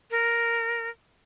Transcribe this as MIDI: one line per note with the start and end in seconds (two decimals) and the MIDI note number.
0.11 0.90 70